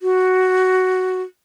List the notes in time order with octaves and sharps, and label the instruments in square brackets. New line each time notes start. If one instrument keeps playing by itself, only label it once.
[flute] F#4